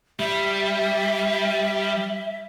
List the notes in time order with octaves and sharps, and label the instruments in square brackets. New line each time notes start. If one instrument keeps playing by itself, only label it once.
[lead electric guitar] G3 [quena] E5